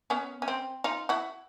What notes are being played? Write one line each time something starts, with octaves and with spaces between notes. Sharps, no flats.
B3 C#4
C#4
C4
D#4 F4
E4 F#4